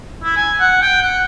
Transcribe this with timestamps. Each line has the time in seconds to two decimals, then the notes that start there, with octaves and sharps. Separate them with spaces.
0.23 E4
0.36 G#5
0.60 F#5
0.82 G5
1.02 F#5